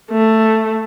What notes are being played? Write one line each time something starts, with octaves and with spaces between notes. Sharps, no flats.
A3